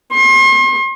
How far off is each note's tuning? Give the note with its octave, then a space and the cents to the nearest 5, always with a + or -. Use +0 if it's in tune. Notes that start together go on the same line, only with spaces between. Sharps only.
C6 +40